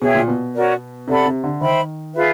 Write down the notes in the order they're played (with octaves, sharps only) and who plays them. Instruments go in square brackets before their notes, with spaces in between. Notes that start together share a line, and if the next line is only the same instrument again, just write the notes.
[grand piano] B2 [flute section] G#4 C#5 E5 G5
[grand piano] A#2
B2
[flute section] C#4 F#4 A#4 D5
[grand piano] C3 [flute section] A4 D5 F#5 B5
[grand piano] C3
D3
[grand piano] D#3 [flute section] C5 E5 G5 B5
[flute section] F4 G#4 B4 E5